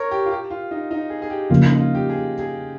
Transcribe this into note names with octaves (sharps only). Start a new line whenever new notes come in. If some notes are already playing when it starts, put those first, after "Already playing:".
Already playing: A#4 C#5
G4
F4
G4
F4
D#4
D#4
G#4
G#4
G4
C#3 F3 A#3 F4
D#4
F4
G4
G#4
G#4